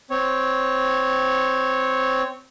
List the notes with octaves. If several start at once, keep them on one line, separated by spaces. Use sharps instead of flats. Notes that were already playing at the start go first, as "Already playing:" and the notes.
C4 C#5